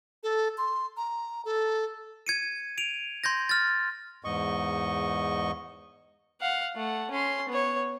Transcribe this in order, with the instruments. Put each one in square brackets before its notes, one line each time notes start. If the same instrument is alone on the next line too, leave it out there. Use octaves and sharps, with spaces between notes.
[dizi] A4
C6
A#5
A4
[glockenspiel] G#6 C#7 D#7
D7 D#7 F7
C6 G6 G#6 A#6
F6 A6
[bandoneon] E2 G#2 D#5 C#6
[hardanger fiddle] F5 F#5
A3 F#5
C#4 C6
B3 C#5